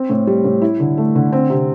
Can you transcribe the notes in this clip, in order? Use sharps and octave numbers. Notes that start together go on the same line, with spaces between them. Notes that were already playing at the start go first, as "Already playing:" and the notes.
Already playing: C4
A2
G3
A2
E4
D3
A3
D3
C4
C3